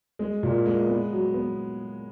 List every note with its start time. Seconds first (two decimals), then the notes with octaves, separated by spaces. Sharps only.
0.19 G#3
0.43 A#2
0.66 G#3
0.88 B3
1.12 F#3
1.34 B3